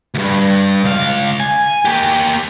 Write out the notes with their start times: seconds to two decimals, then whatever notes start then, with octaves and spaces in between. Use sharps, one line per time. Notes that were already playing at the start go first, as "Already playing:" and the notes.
0.15 D2 G2
0.84 C#2 F5
1.40 G#5
1.85 A#3 G4